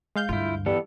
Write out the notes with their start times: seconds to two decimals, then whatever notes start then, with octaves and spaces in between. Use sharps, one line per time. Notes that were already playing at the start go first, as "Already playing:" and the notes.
0.16 G#3 F5 G6
0.29 D2 G2 E4 F4
0.66 E3 G3 B3 A4